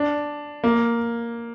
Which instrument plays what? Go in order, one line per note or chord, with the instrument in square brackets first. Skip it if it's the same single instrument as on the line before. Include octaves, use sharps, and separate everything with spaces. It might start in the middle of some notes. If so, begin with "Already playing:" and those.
Already playing: [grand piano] D4
A#3